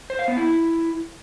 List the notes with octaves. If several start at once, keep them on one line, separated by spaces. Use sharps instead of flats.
C5
F5
B3
E4